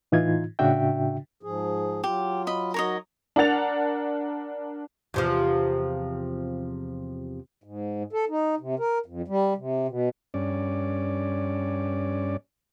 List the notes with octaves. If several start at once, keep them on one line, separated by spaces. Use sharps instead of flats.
A2 E3 D#4 F4 G#6
A2 C#3 D4 F#4 E5 G5
G#2 F3 G#4
F#3 F4 G4
D#5 B5
F#3 D#4 F#4 A#4 C#5 D#5
D4 A#4 F#5 A6 F7
E2 C3 F3
G#2
A4
D#4
C3
A#4
F2
G3
C3
B2
G2 C#4 D5